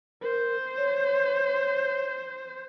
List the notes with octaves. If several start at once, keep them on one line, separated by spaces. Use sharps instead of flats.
A#4 C5
C#5